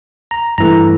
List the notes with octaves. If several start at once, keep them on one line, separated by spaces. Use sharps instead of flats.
A#5
G2 E3 A3 A#5